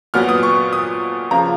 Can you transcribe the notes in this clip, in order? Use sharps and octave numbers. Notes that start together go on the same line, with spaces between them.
A#2 F#3 B3 F6
D#6
C#6
D#6
C#3 F3 A#3 A#5